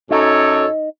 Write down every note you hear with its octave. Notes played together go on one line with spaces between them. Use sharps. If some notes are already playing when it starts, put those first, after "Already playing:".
F#2 D#4 A4 C#5